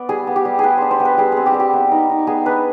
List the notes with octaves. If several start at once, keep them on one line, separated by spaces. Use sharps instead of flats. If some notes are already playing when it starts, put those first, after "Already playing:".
Already playing: B3 D5
G3 G#4
B3
G4
G3
B3 G#4 B4
D4 C5
C5
B3
B4
G3 G#4
C4 G#4
G4
G3
G4
B3
D#4
D#4
B3 G#4
D4 B4